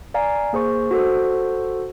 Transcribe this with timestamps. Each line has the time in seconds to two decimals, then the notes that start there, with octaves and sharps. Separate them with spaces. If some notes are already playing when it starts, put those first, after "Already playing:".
0.14 D5 F5 G#5 A#5
0.53 A#3 G#4 C5 C#6
0.91 F#4 A4 C5